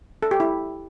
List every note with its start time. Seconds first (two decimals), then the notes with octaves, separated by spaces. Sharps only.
0.22 A4
0.31 G4
0.40 E4